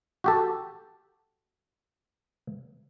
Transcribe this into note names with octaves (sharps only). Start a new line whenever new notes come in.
F#4 G4 A4